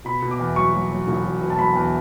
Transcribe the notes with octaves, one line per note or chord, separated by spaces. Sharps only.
B2 B5
B2
D6
E2
F#3 C#6
F#3
F#3
E1
F#3
B2
A5
F#3 B5
E2